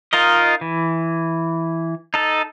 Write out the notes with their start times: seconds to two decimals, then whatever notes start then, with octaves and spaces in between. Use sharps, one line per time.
0.13 D#4 F4 A#4 D#5
0.61 E3
2.14 D#4 A4